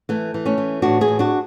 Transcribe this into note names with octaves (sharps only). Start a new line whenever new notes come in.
E3 A3
E3
A3 C#4
E3
A2 D4 F#4
E4 G#4
A2
D4 F#4